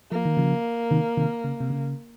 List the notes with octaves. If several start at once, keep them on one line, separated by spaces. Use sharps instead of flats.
F3 A#3
D#3
C#3 F3
C3 D#3
C3 D#3
C#3
C3
C#3